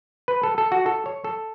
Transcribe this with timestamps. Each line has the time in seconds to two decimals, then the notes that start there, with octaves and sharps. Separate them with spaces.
0.28 B4
0.43 A4
0.58 A4
0.72 F#4
0.86 A4
1.06 C#5
1.24 A4